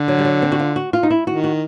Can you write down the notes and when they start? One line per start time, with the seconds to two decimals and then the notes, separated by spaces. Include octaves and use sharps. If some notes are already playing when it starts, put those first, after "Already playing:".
Already playing: D3
0.08 F#3
0.19 G3
0.25 F#3
0.42 C4
0.52 F#4
0.59 F4
0.76 F#4
0.93 F4
1.03 D#4
1.10 E4
1.27 D#3 F#4
1.44 F#4